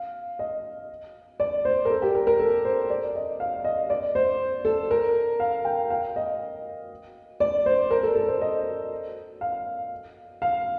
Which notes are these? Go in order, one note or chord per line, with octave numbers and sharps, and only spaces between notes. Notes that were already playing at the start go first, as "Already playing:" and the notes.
Already playing: F5
D#5
D5
C5
A#4
A4
G4
A#4
A#4
A4
C5
D5
D#5
F5
D#5
D5
C5
A4
A#4
F5
G5
F5
D#5
D5
C5
A#4
A4
A4
C5
D#5
F5
F5